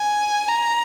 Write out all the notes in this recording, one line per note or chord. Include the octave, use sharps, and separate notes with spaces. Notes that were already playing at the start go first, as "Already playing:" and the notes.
Already playing: G#5
A#5